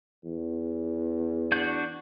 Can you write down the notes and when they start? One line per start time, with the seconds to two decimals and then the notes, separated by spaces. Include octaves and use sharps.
0.24 E2
1.52 D4 F#4 G6